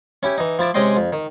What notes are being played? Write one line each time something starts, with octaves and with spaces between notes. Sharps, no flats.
C#4 E4 G4
E3 D#4
F3 E4 A5 D6
C3 G#3 C#4 D#5 G5 C6
F2
D#3